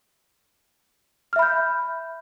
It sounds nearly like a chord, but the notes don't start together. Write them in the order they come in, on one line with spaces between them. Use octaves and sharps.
F6 E5 B5 G6